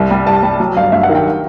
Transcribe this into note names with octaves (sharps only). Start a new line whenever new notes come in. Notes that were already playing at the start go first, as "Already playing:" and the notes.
Already playing: C2
G3
C2 A5
G3
F#3
G1 F5
G2 E5
F#5
D#3
G5